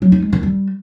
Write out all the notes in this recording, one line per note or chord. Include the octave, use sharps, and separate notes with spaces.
F#3
D#4
G#3
D#3
G3